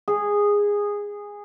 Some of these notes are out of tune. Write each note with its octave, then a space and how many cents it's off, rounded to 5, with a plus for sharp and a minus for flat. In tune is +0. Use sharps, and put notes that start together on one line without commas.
G#4 -15